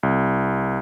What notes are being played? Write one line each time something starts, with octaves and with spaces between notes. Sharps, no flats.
C2